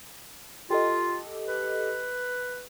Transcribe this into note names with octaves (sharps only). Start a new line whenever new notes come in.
F4 G4 A4 D#5
B4